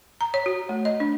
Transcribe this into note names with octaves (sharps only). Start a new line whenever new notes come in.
A#5
C#5
F#4
A3
D#5
D4